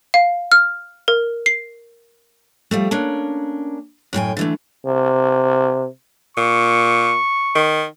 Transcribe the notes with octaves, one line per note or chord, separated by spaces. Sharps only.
F5
F6
A#4
C7
F3 G3 A3
A#3 C#4 D4
F#2 A2 G5 G#5
D3 E3 A3
C3
A#2 C#6
D#3